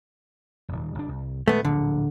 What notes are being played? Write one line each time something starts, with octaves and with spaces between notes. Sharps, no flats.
D#1 G#1
G1 D4
C2
D#1 G#3 A3 B3
D1 A#1 D3